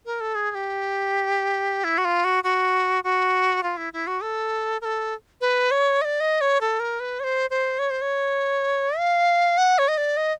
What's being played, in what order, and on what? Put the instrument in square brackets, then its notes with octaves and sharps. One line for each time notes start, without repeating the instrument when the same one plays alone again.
[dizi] A#4
A4
G#4
G#4
G4
E4
F#4
F4
F#4
F#4
F#4
F4
E4
E4
F#4
A4
A#4
A4
B4
C#5
D#5
D5
D#5
C#5
A4
A#4
B4
C#5
C5
C5
C#5
C5
C#5
F5
F#5
C#5
D#5
D5
D#5